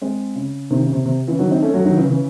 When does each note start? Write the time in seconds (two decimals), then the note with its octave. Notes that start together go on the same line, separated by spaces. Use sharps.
0.01 G#3 C4
0.35 C#3
0.70 C3 D#3
0.82 C#3
0.93 C3
1.06 C3
1.27 C#3 E3
1.39 D#3 F#3
1.51 C4 D#4
1.62 A3 C#4
1.73 F#3 A3
1.85 D#3 F#3
1.97 C#3 E3
2.08 C#3 E3